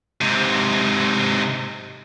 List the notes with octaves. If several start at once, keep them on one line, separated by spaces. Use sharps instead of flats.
G#2 C3